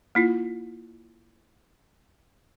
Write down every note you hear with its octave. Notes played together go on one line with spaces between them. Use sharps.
A#3 E4 F4